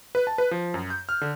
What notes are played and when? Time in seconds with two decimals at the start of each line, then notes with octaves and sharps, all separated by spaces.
0.15 B4
0.27 A5
0.38 B4
0.51 F3
0.74 F#2
0.90 G6
1.09 F6
1.21 D3